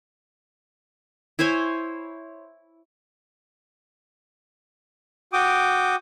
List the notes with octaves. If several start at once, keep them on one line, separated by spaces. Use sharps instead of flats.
E4 C5 C#5 G#5
F#4 G5 D6 D#6